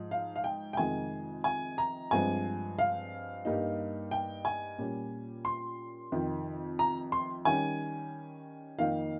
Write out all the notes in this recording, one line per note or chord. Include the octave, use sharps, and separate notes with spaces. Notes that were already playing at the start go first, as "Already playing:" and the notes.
Already playing: G#2 F3
F5
F5
G5
G5
F2 C3 D#3 G#3 G#5
G#5
A#5
G2 F3 G#3 C4 G#5
F5
G2 G3 A#3 D#4
G5
G#5
A#2 G3 C#4
C6
F2 C3 D#3
A#5
C6
D#3 G3 C#4 G#5
F2 D#3 A#3 D#4 F5